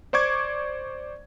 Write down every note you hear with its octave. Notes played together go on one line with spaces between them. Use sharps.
C5 D5 C#6 D6 G#6